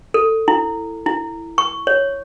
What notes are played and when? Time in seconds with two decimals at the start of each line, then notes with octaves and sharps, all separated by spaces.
0.14 A4
0.48 E4
1.06 E4
1.58 C#6
1.87 C#5